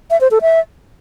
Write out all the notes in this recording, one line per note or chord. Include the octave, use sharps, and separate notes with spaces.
E5
C5
A4
E5